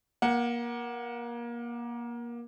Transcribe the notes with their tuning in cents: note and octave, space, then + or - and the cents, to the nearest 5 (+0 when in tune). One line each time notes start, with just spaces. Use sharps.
A#3 +25 F#5 +0